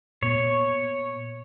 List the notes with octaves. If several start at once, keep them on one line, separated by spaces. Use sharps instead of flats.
A#2 B3 C#5